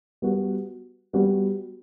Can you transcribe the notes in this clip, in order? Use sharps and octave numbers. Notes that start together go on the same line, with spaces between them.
G3 B3 F#4
G3 B3 F#4